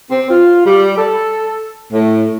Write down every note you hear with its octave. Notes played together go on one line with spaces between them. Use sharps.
C4
F4
G3
A4
A2